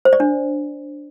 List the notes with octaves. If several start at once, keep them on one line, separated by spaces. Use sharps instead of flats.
C5
D5
D4